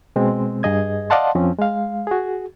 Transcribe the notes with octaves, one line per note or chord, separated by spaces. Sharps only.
B2 G#3 C4
G2 G#4 D#5 G#6
D5 D#5 F5 F#5 A5 C6
F2 F3 C4 C#4
G#3 F5
F#4 G#4